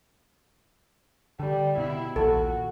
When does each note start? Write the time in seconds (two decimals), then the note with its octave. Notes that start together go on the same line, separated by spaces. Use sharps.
1.39 D3 G3
1.78 B2 E4
2.16 A#1 D#2 A#2 F#4 A4